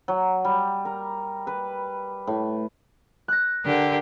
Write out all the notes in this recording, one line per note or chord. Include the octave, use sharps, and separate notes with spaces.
F#3
G3
A#4
B4
A2
F#6 A#6
D3 G4 A#4